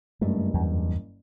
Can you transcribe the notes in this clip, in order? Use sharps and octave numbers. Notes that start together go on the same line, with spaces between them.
F#1 G2 A3
E2